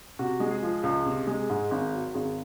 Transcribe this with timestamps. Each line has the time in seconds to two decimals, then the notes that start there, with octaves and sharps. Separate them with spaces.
0.19 C3 F#4
0.40 G#3
0.51 G#4
0.63 F3
0.83 C#2
1.06 C3
1.27 G#3
1.50 G#2
1.71 G#1
1.93 F#3
2.14 G#1 G#4